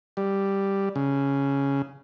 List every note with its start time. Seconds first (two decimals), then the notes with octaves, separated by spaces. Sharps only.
0.17 G3
0.96 C#3